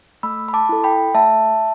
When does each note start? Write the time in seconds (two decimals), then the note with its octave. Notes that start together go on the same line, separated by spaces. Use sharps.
0.23 A3 B5 E6
0.49 B5
0.53 A5 D6
0.69 E4 A4
0.84 G5 B5
1.15 A3 E5 A5